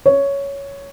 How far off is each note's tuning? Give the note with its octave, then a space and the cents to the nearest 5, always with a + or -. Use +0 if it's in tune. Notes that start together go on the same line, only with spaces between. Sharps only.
C#5 +5